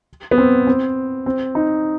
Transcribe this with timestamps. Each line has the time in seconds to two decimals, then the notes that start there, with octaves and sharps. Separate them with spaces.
0.31 B3
0.38 C4
0.67 C4
1.26 C4
1.55 D#4